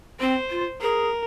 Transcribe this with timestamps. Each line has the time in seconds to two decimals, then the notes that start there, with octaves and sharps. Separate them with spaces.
0.20 C4 C5
0.50 F4
0.81 G#4 A#4